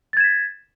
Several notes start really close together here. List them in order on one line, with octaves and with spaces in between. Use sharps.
A6 G#6 E7 B6